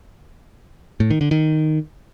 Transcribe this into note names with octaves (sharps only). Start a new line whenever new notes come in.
A2
D#3
D3
D#3